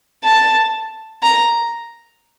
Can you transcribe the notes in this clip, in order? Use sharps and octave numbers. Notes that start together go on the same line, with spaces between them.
A5
A#5